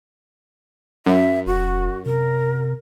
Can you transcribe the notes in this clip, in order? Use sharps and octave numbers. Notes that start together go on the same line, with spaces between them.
F#2 E5
E1 F#4
C3 A#4